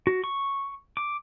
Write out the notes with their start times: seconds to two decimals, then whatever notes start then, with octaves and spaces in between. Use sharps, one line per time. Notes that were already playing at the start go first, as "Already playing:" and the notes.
0.07 F#4
0.24 C#6
0.97 D6